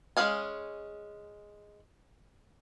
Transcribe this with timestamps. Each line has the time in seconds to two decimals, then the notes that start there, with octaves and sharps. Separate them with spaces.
0.17 G#3 C#4 G#4 F5 G#5